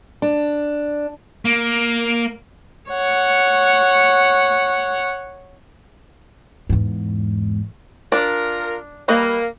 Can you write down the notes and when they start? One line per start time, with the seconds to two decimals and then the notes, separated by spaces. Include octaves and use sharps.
0.22 D4
1.45 A#3
2.90 C#5 F#5
6.69 E2 G#2
8.12 D4 F4 A#4 D5
9.08 G3 A#3 B4 D#5